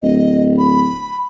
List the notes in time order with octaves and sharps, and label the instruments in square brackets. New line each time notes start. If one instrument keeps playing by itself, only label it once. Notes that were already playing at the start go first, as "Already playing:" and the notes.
[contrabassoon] D1 [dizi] D#5
[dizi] B5